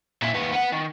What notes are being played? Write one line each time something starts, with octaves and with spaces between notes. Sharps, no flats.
A#2 E4
D#2 B3
B3 F#5
D#3